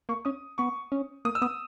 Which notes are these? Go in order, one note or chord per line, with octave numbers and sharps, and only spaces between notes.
A#3 C#6
C#4 D#6
B3 C#6
C#4
A#3 D#6
E6
B3 D#6